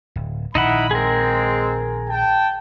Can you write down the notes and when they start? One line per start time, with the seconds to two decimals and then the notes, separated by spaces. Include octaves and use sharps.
0.16 D1
0.55 A#1 D#3 D#4 E4 F#5 B5
0.91 G#3 C4 G#4 A#4
2.09 G5 A5